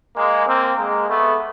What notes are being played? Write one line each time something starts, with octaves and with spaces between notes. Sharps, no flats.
G#3 A#3
A#3 C4
G#3 A#3
A3 B3